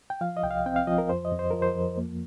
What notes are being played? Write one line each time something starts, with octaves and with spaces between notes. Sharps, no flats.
G5
F3 F5
D#5
C2 G5
F5
C4 G5
F5
F3 D#5
A#4
F2 C5
D#5
F2
C5
F3 A#4
C5
F2
A#3